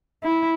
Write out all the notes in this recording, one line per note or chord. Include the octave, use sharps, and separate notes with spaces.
E4